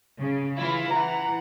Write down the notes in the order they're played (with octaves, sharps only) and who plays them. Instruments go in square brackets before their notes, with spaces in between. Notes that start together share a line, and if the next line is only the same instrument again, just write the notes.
[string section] C#3
E3 E4 F4
[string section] E3 F#5 [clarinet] A#5